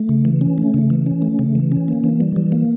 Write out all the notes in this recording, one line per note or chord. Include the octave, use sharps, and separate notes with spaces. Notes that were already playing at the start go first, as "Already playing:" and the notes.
Already playing: A3
C#3
E3
C#4
A3
C#3
E3
C#4
A3
C#3
E3
C#4
A#3
E3
G3
E3
A#3